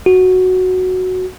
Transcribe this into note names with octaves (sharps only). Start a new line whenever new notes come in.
F#4